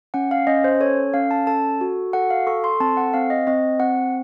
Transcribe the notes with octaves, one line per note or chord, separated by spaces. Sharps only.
C#4 F#5
F5
C#4 D#5
C5
A4 C#5
C#4 F5
A5
A4 A5
F#4
A4 F#5
F5
A4 C#6
C6
C4 A5
F#5
C4 F5
D#5
C4 D#5
C4 F#5